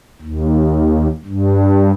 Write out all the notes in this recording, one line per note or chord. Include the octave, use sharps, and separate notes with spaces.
D#2
G2